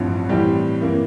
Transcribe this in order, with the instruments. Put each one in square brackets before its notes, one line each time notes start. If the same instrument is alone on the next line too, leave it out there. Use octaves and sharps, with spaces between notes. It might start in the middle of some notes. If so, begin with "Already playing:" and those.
Already playing: [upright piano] A1 G2 F3 C4 E4
A2 E3 G3 C4 G4
A2 E3 A#3 E4